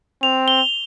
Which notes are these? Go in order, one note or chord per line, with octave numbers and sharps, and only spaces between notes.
C4 F7
G7